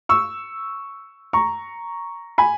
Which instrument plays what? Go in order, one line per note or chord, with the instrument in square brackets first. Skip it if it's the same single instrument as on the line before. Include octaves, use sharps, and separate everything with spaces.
[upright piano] C#6 E6
A#5 C#6
G#5 B5